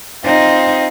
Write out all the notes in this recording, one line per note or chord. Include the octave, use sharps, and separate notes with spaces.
C4 D#4 F4